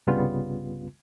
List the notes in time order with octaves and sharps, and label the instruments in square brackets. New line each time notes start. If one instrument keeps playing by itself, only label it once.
[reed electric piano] C2 G2 C#3 G3 B3 F4